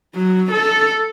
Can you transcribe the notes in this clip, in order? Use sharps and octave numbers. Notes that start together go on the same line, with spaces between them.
F#3
A4